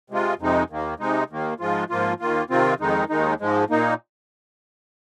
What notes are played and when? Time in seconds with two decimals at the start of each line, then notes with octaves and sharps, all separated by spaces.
0.10 C3 G#3 F4
0.39 F2 C3 G#3 D#4
0.70 D#2 D#3 A#3
1.00 C3 G#3 D#4
1.30 D#2 D#3 A#3
1.60 G#2 F3 G#3 F4
1.90 G#2 F3 A#3 F4
2.20 D#2 D#3 A#3 F4
2.50 C3 D#3 C4 F4
2.80 F2 D#3 G#3 D#4
3.10 D#2 D#3 G#3 D#4
3.40 G#2 F3 G#3
3.70 A#2 A#3 D#4